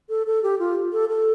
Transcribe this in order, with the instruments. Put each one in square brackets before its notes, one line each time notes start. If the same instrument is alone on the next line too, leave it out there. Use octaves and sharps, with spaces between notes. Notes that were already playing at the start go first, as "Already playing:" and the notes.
[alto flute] A4
A4
G4
F4
A4
A4